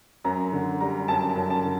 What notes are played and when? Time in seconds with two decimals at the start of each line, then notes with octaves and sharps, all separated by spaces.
0.25 F#2 A#5
0.52 D3
0.80 G3 A#5
1.08 F#2 A5
1.29 A5
1.36 F#2
1.50 A5
1.64 D3